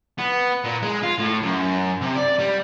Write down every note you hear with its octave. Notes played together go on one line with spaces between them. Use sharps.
B3
A#2
G#3
F4
A2
F#2
C3
D5
G3